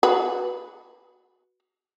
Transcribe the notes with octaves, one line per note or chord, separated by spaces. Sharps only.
F#4 B4